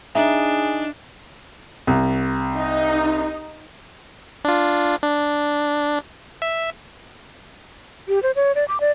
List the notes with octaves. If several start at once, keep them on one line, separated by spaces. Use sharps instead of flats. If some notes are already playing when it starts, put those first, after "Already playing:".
D4 D#4 G#4 E5
C2
D#4
D4 F4
D4
E5
G4
C5
C#5
D5
D6
D5